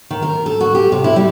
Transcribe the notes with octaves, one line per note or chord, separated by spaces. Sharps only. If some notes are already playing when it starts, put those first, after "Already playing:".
D#3
A#4
A4
F#4
G4
C3
E4
G3